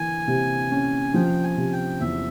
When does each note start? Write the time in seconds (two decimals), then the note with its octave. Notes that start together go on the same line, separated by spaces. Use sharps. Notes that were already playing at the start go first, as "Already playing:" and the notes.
Already playing: E3 A#3 G#5
0.27 C3
0.71 C#4
1.14 F3 G5
1.43 G#5
1.57 C3
1.72 G5
2.01 E2 E5